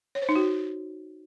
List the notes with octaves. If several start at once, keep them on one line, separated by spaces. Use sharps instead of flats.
C#5
C5
D#4
F#4